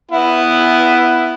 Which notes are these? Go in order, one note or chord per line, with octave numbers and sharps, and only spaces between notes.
B3 E4 F#5